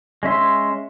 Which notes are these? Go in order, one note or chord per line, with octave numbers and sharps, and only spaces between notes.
G#3 C#4 E5 C6